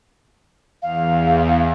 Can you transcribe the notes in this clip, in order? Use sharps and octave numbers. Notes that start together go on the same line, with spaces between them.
E2 F5